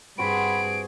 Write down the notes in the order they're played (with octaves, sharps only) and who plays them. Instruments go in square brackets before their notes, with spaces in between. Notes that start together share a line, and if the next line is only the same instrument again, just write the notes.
[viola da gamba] G2 G#4 [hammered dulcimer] C4 F#4 C5 [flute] B5 [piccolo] D7